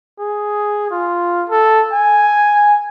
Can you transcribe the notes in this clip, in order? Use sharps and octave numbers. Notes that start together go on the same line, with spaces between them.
G#4
F4
A4
G#5